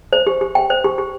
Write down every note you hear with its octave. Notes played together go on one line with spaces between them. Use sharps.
C5
G4
G4
G5
C5
G4
G4